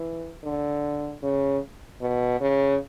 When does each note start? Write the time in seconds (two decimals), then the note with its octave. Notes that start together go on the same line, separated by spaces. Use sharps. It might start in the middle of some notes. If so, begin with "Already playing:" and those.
Already playing: E3
0.44 D3
1.23 C#3
2.01 B2
2.40 C#3